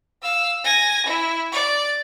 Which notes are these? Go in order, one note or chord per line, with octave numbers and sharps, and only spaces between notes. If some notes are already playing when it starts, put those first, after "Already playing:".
F5 E6
G#5 A#6
E4
D5